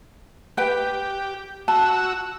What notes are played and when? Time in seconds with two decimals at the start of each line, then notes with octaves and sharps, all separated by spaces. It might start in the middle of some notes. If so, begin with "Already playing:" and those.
0.57 G4 B4 G5
1.68 F#4 A5 E6